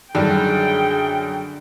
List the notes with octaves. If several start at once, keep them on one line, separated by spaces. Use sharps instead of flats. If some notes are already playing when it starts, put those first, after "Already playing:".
F#2 D3 D#3 G3 G#4 G5